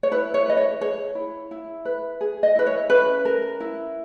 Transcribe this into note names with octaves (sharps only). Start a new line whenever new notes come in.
C#5
E4 B4
C#5
B4 D#5
C#5
G#4 C#5
E4
E4
B4
G#4
D#5
E4 B4
C#5
C#4 B4
A#4
E4